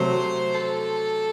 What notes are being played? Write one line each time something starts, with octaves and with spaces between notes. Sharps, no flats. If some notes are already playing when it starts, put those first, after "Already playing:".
Already playing: C3 F#3 A3 C5
A4